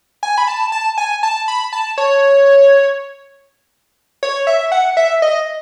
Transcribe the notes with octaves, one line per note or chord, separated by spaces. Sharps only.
G#5
B5
A5
A5
G#5
A5
B5
A5
C#5
C#5
E5
F#5
E5
D#5